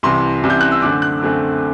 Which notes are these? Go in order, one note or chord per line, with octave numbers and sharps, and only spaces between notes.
C2 C3 E3 C6
C2 C3 E3
G6
F#6
E6
F#2 D3 A3 C4 D6
F#6
F#2 D3 A3 C4